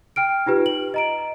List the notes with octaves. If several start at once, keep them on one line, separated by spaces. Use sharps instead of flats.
G5 F6 D7
D#4 F4 G4 B4
F#7
D#5 A#5 D7